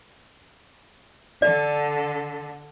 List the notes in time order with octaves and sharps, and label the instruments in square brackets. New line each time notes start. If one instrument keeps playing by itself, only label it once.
[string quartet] D3 A4 [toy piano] D5